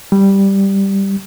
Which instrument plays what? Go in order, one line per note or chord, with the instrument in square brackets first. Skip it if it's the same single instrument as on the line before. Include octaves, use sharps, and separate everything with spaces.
[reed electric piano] G3